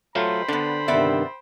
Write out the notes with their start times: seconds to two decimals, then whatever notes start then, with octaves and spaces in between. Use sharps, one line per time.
0.15 F#3 A3 F4 C5 G5 B5
0.49 D3 B3 D4
0.88 G2 C3 D#3 B3 D5 E5